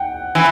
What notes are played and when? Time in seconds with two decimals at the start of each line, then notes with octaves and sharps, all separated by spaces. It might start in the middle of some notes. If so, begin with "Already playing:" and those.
Already playing: F#5 G5
0.35 E3